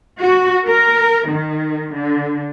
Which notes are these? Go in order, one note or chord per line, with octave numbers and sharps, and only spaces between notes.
F#4
A#4
D#3
D3